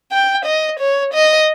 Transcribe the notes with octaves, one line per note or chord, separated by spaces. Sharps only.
G5
D#5
C#5
D#5